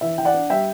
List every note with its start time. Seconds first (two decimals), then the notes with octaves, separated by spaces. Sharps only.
0.01 E3 E5
0.18 E3 G5
0.25 D5 F#5
0.34 D4
0.50 G3 E5 G5